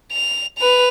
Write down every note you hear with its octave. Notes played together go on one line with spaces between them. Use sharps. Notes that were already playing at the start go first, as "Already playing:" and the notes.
F7
B4 F7